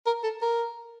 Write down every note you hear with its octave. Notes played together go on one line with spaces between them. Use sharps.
A#4
A4
A#4